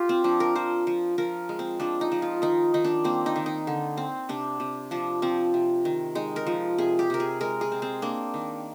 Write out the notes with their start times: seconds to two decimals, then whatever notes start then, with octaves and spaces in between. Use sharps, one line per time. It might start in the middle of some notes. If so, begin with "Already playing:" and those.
Already playing: F4 G4
0.09 C4
0.24 F3 D4
0.40 A#4
0.56 F3 C5
0.87 F3
1.18 F3 A#4
1.49 G#3
1.59 C4
1.80 F3 D4
2.01 D#4
2.12 F3
2.22 F4
2.42 D#3 D#4
2.74 D#3 D#4
2.84 D4
3.04 A#3 C4
3.26 D#4
3.36 D#3
3.46 D#4
3.67 D3
3.97 C4
4.29 C3 D4
4.60 C3
4.91 F3 D4
5.22 F3 C4
5.54 C3
5.85 D#3
6.15 G#3 D#4
6.36 A#4
6.47 F3
6.78 C3 G#4
6.99 G4
7.10 C3 A#4
7.20 G#4
7.41 G#3 A#4
7.61 G#4
7.72 C4
7.82 C4
8.02 A#3 D4
8.34 D#3